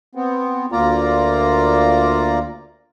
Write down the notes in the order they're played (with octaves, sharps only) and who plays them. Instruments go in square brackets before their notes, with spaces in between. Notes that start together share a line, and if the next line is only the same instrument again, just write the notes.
[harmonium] B3 C4
D2 A#3 F4 D5 A#5